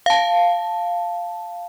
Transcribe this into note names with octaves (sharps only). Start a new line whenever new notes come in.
F5 A5